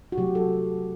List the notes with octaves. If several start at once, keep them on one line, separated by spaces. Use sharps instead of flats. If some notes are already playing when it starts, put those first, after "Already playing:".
F#4
C3 F#3 A3 G4
A4